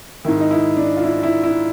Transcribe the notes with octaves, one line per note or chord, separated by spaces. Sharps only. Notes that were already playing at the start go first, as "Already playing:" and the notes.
G#2 D#3 E4
D#4
E4
D4
F4
E4
E4
E4